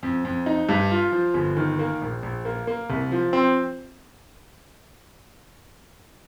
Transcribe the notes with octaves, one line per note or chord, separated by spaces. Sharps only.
F2
F2
D#4
G2
F4
F3
G1
D#3
A#3
A#1
A#1
A#3
A#3
C2
F3
C4